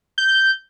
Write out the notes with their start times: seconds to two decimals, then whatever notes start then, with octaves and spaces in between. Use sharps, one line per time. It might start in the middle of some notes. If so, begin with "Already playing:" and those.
0.18 G6